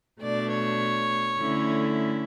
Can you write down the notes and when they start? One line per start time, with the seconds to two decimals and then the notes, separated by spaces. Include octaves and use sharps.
0.21 B2 A3 D4 D5
0.50 C#5
1.40 D3 A3 C#4 E4